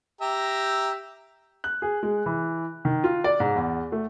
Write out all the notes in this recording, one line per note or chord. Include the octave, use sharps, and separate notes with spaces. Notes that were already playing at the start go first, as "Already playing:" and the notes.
G4 E5 A#5
F#6
G#4
G#3
E3
D#3
F4
D5
G#2
E2
A3